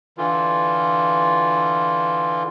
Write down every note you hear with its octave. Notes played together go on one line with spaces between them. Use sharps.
D3 E3 F4